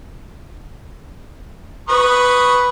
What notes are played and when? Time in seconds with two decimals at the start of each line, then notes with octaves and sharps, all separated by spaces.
1.89 B4 B5 C#6 D#6